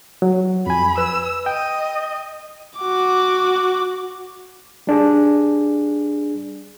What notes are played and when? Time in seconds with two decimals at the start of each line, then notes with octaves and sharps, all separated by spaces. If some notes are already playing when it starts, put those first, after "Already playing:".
0.22 F#3
0.67 F2 G#5 B5
0.98 B4 E6
1.46 D#5 G5
2.79 F#4 D6
4.87 G3 D4 G#4